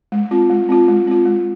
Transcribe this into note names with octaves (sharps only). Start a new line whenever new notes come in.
G#3
C4 F4
G#3
C4 F4
G#3
C4 F4
G#3